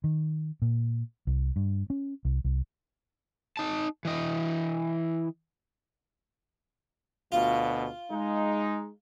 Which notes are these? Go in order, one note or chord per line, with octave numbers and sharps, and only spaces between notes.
D#3
A#2
C2
G2
C#4
C2
C2
D#4 A5
E3 D#5
D2 B2 F4
G#3 D#4